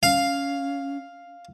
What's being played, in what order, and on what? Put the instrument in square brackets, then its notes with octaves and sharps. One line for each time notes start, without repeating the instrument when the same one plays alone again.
[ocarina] C#4 [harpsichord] F5